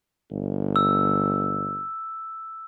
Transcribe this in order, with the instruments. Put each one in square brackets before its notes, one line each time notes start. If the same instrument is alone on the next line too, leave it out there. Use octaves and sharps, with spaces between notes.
[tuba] G1
[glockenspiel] E6